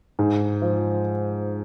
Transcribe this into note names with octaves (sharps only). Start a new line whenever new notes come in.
G#2
F3